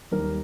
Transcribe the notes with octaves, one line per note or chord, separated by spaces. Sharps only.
D#2 D#3 G3 A#4